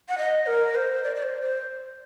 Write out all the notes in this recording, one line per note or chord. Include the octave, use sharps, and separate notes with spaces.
F#5
D#5
A#4
C5
D5
D5
C5
C5